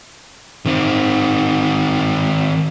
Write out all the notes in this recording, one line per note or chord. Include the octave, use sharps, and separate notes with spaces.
D#3 C4